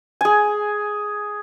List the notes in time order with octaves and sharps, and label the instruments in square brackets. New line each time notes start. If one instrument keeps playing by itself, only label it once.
[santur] G#4 G#5